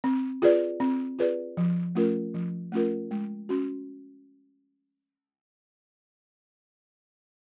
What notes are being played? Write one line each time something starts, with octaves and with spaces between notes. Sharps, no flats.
C4
F4 G#4 B4 D5
C4
F4 G#4 B4 D5
F3
A3 C#4 F4 A#4
F3
A3 C#4 F4 A#4
G#3
C#4 F#4